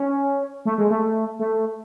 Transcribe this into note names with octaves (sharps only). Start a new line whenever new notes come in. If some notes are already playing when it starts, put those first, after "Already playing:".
Already playing: C#4
A3
G#3
A3
A3